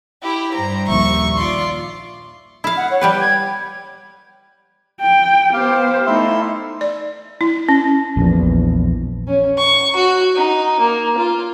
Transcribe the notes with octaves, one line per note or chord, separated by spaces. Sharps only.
E4 G4
G2 C5 A#5
A#1 D#2 E5 C#6
F4 D5 C6 D6
E4 F5
F#5
C#5
G3 G4 B4 G5
G#6
G5
B3 G4 C5 F5
A3 D#4 E4 E5 C6
D5
E4
C#4
A#1 E2
C#4
C#6
F#4
D#4
A#3
F4